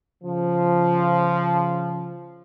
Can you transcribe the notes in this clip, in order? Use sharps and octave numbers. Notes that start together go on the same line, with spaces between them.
C#3 F3